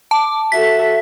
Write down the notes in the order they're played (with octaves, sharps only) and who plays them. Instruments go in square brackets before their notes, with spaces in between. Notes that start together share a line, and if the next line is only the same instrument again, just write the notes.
[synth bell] A5 [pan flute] D6
[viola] F#4 A4 [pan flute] E5 [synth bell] B6